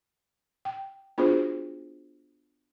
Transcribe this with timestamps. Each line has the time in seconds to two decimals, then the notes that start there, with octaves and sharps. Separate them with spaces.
0.65 G5
1.18 B3 D4 F4 F#4 G#4 C5